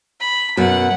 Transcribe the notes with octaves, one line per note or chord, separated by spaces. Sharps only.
B5
F#2 B2 F#5